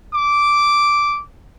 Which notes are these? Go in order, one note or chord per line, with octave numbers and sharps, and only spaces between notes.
D6